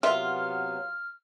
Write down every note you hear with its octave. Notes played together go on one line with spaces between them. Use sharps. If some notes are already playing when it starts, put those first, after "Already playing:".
C3 F#3 B3 F4 A#4 B4 E5 F6